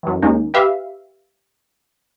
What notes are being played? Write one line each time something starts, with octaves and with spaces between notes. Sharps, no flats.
F#2 E3
D#2 G#3 A#3 C#4 D#4
G4 B4 E5 F5